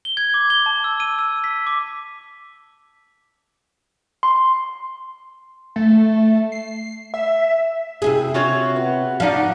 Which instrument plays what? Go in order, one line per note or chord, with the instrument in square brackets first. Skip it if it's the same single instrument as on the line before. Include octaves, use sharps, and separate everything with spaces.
[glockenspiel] G7
G#6
D6
G7
A5
E6
D#7
E6
B6
D6
[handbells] C6
[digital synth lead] A3
C7
E5
[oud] C3 E4 G#4
[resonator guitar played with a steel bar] F4 F#4 C#5
[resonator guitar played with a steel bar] B3 [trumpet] F#5
[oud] F3 D5 [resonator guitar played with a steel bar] D#4 F5